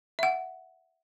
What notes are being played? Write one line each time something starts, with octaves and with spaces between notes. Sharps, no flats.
E5 F#5